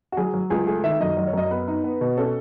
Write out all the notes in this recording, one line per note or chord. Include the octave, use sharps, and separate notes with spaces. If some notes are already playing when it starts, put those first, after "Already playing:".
F#4
F#3 G#4
F#3
C#2 G#4
A3 G#4
D#3 E5
F#2 D#5
F#3 D#5
C#5
F#2 D#5
B3 B4
D#4
B3
B2
C#4 A4